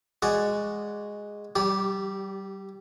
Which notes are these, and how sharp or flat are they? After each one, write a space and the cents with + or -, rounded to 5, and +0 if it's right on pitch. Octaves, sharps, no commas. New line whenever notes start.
G#3 -5 F#4 +0 D5 +0
G3 -30 G4 +0 D5 -30